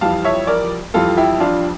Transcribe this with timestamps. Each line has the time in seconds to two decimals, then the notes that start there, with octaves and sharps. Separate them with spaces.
0.01 F2 E3 G3 F5 A5
0.24 C#5 E5
0.47 A#4 D5
0.94 F2 E3 G3 F4 A4
1.17 E4 G4
1.40 D4 F4